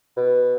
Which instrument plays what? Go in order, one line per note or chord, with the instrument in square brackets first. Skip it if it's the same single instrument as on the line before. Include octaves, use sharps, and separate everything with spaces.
[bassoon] B2